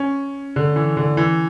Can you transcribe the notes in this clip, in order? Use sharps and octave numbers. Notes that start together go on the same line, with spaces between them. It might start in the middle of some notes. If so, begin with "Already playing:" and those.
Already playing: C#4
D3
E3
D3
E3